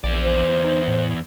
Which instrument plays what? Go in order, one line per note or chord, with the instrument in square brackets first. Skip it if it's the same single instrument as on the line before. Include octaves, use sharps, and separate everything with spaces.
[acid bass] A#1 [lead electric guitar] E2 D5
[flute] C5
[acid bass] D#4
A2